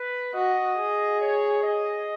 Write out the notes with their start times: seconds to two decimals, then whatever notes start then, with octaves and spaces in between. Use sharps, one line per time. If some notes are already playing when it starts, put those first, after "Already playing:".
Already playing: B4
0.34 F#4 D#5
0.77 G#4
1.20 C#5
1.63 D#5